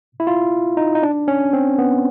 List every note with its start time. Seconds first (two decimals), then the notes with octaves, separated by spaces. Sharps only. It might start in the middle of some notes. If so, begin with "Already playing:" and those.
0.20 E4
0.27 F4
0.77 D#4
0.95 D#4
1.03 D4
1.28 C#4
1.53 C4
1.78 B3